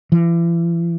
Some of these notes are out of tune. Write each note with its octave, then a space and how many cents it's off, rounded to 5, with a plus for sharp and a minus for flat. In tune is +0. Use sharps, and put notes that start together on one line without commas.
E3 +40